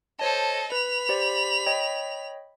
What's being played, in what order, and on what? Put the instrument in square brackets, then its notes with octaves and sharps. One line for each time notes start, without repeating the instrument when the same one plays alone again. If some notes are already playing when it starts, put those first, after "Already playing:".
[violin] A4 D#5 [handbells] C5 C#5 A5
[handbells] B4 [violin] B5 F7
[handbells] G4 C5 D5
C#5 D#5 G5